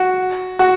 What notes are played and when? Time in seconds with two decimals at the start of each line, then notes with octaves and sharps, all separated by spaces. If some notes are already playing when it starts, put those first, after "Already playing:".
Already playing: F#4
0.59 F#4